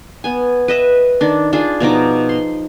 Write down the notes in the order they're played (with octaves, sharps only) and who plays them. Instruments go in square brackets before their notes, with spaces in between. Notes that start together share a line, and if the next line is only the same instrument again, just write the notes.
[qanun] B3 G#5
B4 D#5 E5
D#3 D4
D4 F4 G#4
B2 F3 D#4 D6
C6